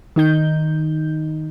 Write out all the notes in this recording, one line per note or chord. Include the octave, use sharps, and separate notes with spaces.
D#3 D#4 G6